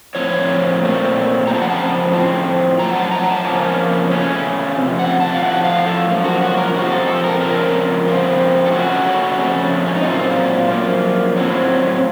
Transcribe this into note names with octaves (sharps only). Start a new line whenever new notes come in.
A2 F3 C4 C#5
A#2 A3 C4
F2 C#3 F3 C4 A#5
A5
F#5
A5
A2 F3 C4
F#2 F3 C4 A#5
F#5
A5
A#5
F#5
A5
F2 C#3 F3 A#3 C#4
C#3 A3 C#4
F2 C3
F#5
A5
F5
A2 F3 A3 F#5
F5
A4
F#2 F3 A#3
F#4
F#4
A#4
F2 C3 F3 C4 F#4
A4
A4
A#4
C#3 F3 C4 A#4
C#3 F3 C4
A4
C#3 A3 C#4 F#4
F2 C#3 A3
C#4
D#4
A#2 F#3 A3 C4 F4
F#2 F3 A#3
A2 F#3 C4